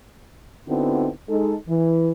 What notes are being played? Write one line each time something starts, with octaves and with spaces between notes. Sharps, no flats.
D3 B3 C4 D#4 E4 F#4
G#3 D#4 A4
E3